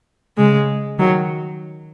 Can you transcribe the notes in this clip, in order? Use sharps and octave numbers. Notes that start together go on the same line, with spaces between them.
C#3 G#3
D#3 F#3